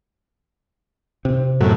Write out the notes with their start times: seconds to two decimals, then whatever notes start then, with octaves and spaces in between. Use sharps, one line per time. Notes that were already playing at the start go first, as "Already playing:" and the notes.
1.25 C3
1.61 F#2 A2 F#3